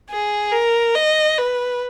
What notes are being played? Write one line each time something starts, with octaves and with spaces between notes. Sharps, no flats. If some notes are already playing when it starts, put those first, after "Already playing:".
G#4
A#4
D#5
B4